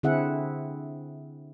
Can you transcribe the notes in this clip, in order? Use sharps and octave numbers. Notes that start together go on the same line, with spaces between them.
D3 C4 E4 G#4 E5 F#5